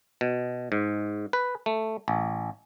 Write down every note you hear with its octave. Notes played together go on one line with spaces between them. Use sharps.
B2
G#2
B4
A3
A1